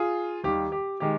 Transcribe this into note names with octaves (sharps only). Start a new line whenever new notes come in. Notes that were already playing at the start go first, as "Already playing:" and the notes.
Already playing: F4 G#4
D#2 D#3 G3 G4
G4
D#3 G#3 G4